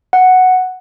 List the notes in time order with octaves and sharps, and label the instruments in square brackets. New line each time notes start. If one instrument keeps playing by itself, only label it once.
[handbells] F#5